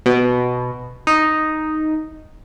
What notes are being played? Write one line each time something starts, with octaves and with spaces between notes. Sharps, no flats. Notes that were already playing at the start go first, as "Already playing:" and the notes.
B2
D#4